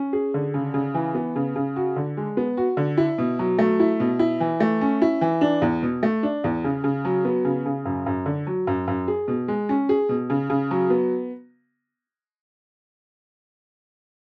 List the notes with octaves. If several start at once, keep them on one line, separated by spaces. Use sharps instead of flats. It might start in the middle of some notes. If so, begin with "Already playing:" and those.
Already playing: C#4
G#4
D3
C#3
C#3
E3
B3
C#3
C#3
F#4
D3
G#3
B3
F#4
D3
E4
B2
F#3
A3
E4
B2
E4
E3
A3
C#4
E4
E3
D4
E2
B2
A3
D4
E2
C#3
C#3
F#3
B3
C#3
C#3
F#2
F#2
D3
F#3
F#2
F#2
G#4
B2
G#3
C#4
G#4
B2
C#3
C#3
F#3
B3